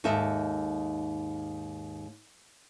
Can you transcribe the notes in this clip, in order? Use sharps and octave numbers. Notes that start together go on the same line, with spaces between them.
D#2 G#2 D#4 A4 E5